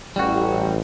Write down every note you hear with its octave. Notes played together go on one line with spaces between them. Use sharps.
A1 G3 F#4